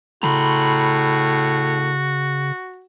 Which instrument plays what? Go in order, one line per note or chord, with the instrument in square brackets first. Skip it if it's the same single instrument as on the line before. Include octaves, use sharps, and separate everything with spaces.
[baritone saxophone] A2 [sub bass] C#3 [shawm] F#4 [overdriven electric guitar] A#5 B5